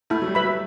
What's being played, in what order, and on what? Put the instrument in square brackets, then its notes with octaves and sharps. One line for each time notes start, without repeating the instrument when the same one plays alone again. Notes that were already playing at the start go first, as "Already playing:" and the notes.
[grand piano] A3 [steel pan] E4
[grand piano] F#3
G3
[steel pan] B4 E5 B5
[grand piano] F#3